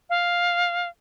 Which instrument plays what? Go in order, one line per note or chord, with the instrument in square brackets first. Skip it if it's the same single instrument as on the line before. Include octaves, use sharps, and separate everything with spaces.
[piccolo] F5